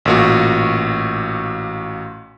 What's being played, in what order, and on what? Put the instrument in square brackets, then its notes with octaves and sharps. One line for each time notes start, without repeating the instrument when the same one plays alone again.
[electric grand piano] A1 A#2 F#4